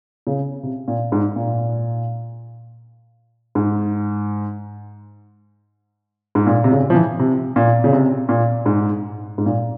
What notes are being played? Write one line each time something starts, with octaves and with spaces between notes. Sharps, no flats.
C#3
C3
A#2
G#2
A#2
G#2
G#2
A#2
C3
C#3
F3
E3
C3
A#2
C#3
C3
A#2
G#2
G#2
A#2